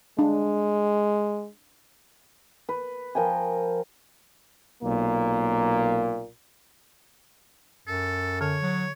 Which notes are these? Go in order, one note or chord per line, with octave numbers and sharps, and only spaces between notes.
G#3 D4
B4
F3 A#4 G5 G#5
B1 A#2 A#3
F#2 A4
D3 C#5
F#3